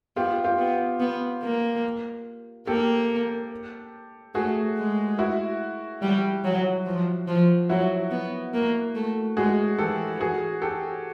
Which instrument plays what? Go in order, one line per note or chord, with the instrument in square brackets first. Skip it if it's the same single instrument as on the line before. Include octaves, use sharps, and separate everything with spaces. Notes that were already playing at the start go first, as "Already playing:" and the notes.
[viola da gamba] B3 [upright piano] F4 G4
[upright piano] F4 G4
[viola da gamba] B3
B3
A#3
[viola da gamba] A#3 [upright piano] G4 A4
[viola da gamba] A3 [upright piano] F#4 G#4
[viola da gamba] G#3
[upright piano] E4 F#4
[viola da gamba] G3
F#3
F3
F3
[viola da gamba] F#3 [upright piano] E4 F#4
[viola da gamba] B3
A#3
A3
[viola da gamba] G#3 [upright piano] F#4 G#4
[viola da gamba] E3 [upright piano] G4 A4
[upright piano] F#4 G#4
G4 A4